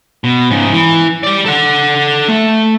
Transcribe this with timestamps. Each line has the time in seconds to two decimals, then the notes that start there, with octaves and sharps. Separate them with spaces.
0.24 B2
0.51 G#2 C#3
0.73 E3
1.23 G3 D5
1.46 A4 F#5
2.28 A3